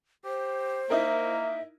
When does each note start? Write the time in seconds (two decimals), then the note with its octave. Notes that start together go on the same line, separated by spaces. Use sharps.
0.25 G4 C5
0.90 A#3 D#4 E4 A#4 E5